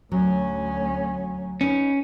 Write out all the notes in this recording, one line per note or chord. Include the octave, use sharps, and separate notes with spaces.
D2 F#3 C#4
C#4 D#4 B4